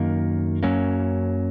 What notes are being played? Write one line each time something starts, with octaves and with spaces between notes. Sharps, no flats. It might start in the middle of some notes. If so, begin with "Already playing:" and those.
Already playing: F#2 D#3 A#3
F#2 F#3 A#3 C#4